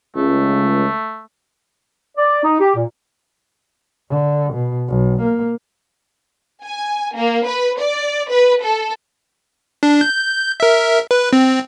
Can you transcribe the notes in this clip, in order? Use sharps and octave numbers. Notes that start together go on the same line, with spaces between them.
C#2 A3
D5
D#4
G4
A#2
D3
B2
B1
A#3
G#5
A#3
B4
D5
B4
A4
D4
G6
A#4 E5
B4
C4